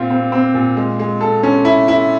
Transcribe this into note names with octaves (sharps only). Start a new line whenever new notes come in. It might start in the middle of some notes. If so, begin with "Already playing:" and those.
Already playing: A#2 C4 F4
C4
C4
A#2
G#3
G#3
A4
C#4
E4
E4